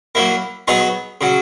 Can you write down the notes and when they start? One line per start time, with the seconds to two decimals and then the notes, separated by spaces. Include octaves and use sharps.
0.15 F#3 A#3 E4
0.68 F#3 B3 D#4 G#4 C#5
1.21 C#3 F#3